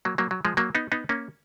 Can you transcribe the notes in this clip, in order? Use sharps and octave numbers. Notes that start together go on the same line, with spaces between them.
F#3 A#3
F#3 A#3
F#3
F3 G#3
F#3 A#3
B3 D#4
B3 D#4
A#3 C#4